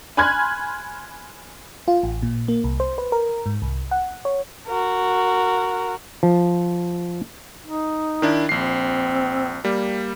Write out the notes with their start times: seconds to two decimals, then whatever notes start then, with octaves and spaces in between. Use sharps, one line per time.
0.17 G#5 B5 C6 F6 F#6 G#6
1.88 F4
2.03 A1
2.23 A#2
2.48 A#3
2.64 C2
2.80 C5
2.98 B4
3.12 A#4
3.46 G#2
3.62 C2
3.91 F#5
4.25 C#5
4.67 F#4 A#4
6.23 F3
7.64 D#4
8.22 D#3 D4 E4
8.49 A#1 C4 C7
9.65 G3 A#3